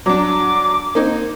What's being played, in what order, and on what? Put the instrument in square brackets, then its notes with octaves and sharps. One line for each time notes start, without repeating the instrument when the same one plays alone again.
[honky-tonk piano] F#3 D4 [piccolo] D6
[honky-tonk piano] A#3 C4 D#4